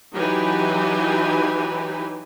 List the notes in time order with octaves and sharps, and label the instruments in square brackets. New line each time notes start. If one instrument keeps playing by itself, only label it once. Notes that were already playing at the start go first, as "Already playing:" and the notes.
[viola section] E3 F#3 D#4 G4 B4 G#5